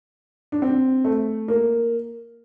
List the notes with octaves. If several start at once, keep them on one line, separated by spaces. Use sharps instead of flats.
D4
C4
A3
A#3